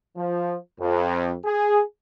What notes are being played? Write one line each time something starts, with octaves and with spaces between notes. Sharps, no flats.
F3
F2
G#4